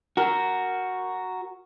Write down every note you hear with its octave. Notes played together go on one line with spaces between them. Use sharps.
F#4 A#4